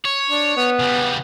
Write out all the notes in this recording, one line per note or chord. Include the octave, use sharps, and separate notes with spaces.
C#5
D4
B3
C#3 G3